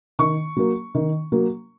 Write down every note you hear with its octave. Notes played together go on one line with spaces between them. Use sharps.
D#3 C#6
F#3 A#3
D#3
F#3 A#3